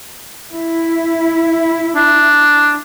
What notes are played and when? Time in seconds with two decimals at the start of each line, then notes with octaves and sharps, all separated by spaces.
0.52 E4
1.96 D4